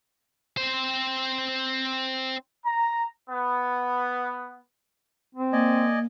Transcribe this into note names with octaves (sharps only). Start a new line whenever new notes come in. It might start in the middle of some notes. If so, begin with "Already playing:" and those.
C4 C5
A#5
B3
C4
A#3 D5 D#5 G#5